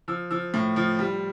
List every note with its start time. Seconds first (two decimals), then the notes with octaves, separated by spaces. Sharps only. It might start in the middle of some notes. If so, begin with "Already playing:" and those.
0.08 F3 E6
0.31 F3 E6
0.54 A2
0.76 F3
0.99 G3